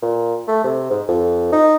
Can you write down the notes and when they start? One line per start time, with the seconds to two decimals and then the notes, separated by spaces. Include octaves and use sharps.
0.02 A#2
0.48 A3
0.64 C3
0.90 G#2
1.08 F2
1.52 D#4